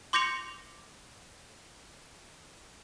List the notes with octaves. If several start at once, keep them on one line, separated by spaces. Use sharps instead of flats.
C6 D6 G6 A#6 C#7 F7